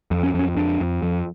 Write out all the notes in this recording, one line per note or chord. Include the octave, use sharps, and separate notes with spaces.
F2
C#4
F2
C#4
F2 D4
F2
F2